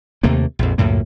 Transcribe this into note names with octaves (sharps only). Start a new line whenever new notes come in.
D#2 C3 A3 A#3
A#1 F2
C#2 F#2 A2 A#3